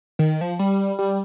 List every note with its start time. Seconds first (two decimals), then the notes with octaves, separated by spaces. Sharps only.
0.19 D#3
0.41 F3
0.59 G3
0.99 G3